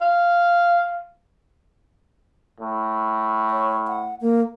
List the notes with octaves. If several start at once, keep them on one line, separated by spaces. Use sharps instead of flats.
F5
A2
C#5
F#5
A#3